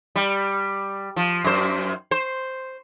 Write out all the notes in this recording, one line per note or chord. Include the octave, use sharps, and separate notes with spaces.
G3
F3
F#2 C5
C5